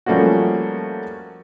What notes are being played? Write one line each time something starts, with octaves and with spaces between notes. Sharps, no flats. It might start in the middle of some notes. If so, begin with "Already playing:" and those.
F3 G3 A3 A#3 C#4 F#4